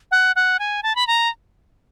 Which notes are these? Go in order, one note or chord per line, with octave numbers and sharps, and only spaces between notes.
F#5
F#5
G#5
A5
B5
A#5